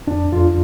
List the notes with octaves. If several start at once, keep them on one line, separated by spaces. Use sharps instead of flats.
F2 D4
F2 F4